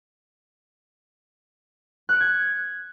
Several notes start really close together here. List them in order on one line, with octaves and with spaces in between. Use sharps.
F#6 C#7 D7 G#6